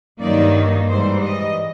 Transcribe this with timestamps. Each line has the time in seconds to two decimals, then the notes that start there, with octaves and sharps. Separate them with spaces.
0.20 G2 D#3 F#3 A#3 D#4 D5
0.87 G#2 E3 G3 C5
1.22 D#5